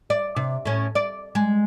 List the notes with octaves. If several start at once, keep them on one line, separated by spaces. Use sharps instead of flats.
D5
C3
A2 C#4
D5
G#3